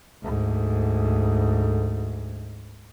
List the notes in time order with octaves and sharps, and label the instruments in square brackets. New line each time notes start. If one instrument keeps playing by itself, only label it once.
[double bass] D2 G#2